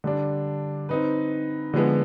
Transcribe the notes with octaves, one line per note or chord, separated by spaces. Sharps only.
D3 G3 D4
C4 D#4 B4
D3 F3 G#3 B3